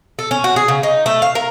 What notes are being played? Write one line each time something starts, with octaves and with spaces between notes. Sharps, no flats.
A4
C#4
F#4
G#4
C#3
D#4
A3
F5
A#4